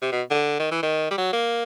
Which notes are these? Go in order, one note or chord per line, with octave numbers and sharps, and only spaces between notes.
C3
B2
D3
D#3
E3
D#3
G3
F#3
A#3